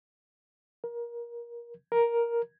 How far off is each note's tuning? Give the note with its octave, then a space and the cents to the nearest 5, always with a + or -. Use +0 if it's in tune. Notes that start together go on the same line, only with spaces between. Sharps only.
A#4 +25
A#4 +10